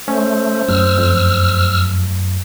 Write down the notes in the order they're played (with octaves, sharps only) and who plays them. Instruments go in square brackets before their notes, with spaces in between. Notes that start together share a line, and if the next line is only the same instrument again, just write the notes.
[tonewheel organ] A3 [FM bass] C#4 [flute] C5
[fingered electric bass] F#2 F#3 A3 [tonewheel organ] E6 F6
[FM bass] F2